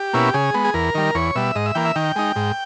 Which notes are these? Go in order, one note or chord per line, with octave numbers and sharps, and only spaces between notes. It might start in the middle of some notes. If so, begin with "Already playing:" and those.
Already playing: G4
B2 A#3 C#4 E4
C#3 G#4
G#3 B3
G#4
E2 A#4
D#3 G3
E2 C#5
B2 G3 E5
G#2 D#5
E5
E3 A#3 G5
E5
D#3 G5
G#3 D#4
G#2